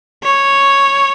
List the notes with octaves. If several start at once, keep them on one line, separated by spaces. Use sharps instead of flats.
C#5